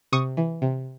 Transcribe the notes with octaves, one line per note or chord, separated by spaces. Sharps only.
C3 C#6 D#6
E3
C3